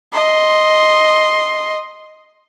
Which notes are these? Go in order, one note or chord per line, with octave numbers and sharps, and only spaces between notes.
D#5 C6